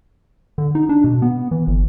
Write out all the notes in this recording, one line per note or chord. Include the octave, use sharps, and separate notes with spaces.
D3
D#4
D4
B2
B3
E3
G1